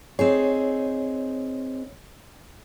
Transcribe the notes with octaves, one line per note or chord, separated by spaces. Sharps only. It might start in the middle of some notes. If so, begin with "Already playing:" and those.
C4 D#4 G#4 C#5